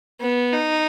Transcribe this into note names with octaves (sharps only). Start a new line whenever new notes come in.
B3
D#4